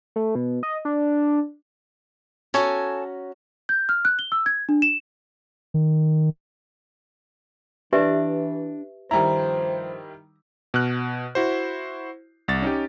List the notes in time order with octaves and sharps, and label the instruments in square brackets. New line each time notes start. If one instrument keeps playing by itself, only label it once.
[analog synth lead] A3
B2
D#5
D4
[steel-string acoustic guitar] C#4 F#4 A#5 [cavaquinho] A4 C#5 G#5
[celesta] G6
F6
F#6
G7
E6
G#6
D4
E7
[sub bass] D#3
[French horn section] E3 [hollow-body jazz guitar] D4 [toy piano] G4 B4 E5
[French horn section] G2 F3 C5 [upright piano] D#3 G3 E4 [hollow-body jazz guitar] A#5
[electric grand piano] B2 F6 F#6
E4 F#4 C5
C2 A6
C#4 D#4 G4